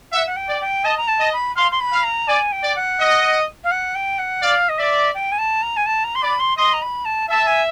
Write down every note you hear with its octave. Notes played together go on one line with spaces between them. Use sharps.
E5 F#5
F#5
G5
D5
G5
D#5 A5
A#5
A5
D#5
B5
F5 C6
C6
B5
F5
A#5
D5 G#5
G5
D5
F#5
D#5
F5
F#5
G5
F#5
D5 F5
D#5
D5 E5
G5
G#5
A5
A#5
G#5
A5
A#5
C6
D5 B5
C6
D#5 C6
A#5
B5
A5
E5 A5
G#5